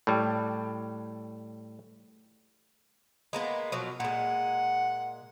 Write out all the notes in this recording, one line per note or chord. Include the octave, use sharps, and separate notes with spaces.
A2 G3
G#3 A#3 B3
B2 F3 F#3
A#2 G#3 F#5